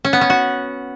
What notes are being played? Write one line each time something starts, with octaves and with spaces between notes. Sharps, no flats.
C#4
B3
C#4
F#4